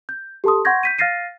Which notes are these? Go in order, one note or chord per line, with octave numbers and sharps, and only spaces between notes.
G6
G4 A4 A5 C6 D#6
F#5 C6 C#6 G6 G#6 A#6
G6 B6 D#7
F5 F6 A6 A#6 C7 D#7